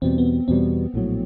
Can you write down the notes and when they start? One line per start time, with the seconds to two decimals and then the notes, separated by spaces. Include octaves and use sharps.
0.02 E2 B2 G3 C4
0.18 B3
0.48 E2 B2 G3 C4
0.94 A#1 A2 F#3